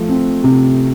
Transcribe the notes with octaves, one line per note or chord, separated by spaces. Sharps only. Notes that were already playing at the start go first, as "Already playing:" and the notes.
Already playing: F3 A3
C4
C3